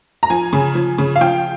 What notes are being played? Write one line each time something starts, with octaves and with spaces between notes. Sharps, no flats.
A#5
F3 G#5
C#3
F3
C#3
F5
F3 G5